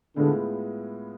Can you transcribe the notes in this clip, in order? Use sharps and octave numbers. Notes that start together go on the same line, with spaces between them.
A2 D3 G#3 B3 F4 G#4